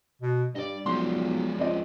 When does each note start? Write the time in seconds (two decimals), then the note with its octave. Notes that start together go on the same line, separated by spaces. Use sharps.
0.21 B2
0.55 G2 G3 D5 D#5
0.86 B1 F3 G#3 C6
1.59 C#2 C4 D5 D#5